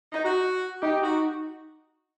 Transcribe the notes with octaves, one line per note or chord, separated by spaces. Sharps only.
D#4
F#4
D#4 G4
F#4